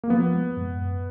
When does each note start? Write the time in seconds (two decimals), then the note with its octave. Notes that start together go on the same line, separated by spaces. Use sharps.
0.04 A#3
0.10 F3 B3
0.33 G#3
0.57 F#2
0.80 F#2